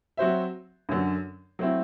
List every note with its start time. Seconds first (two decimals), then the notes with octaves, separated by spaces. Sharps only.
0.17 F#3 C4 F#4 C5 E5
0.89 F#2 D3 F#3
1.59 F#3 A3 C4 E4